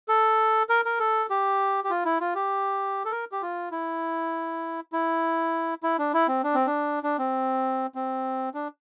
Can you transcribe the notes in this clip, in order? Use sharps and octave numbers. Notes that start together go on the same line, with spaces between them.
A4
A#4
A#4
A4
G4
G4
F4
E4
F4
G4
A4
A#4
G4
F4
E4
E4
E4
D4
E4
C4
D4
C4
D4
D4
C4
C4
D4